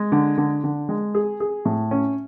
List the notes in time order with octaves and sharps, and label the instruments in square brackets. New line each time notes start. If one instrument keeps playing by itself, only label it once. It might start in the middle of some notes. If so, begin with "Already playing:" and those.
Already playing: [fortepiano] G#3
D3
D3
D3
G#3
G#4
G#4
A2
C#4